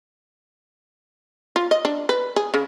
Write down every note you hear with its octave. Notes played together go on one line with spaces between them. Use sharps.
F4
D#5
D4
B4
G#4
C#3